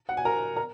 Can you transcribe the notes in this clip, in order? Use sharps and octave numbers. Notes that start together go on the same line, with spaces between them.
F#5
G#5
A#4 A#5
A#4 A#5